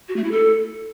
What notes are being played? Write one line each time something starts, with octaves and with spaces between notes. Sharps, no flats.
F#4
A3
E4
A4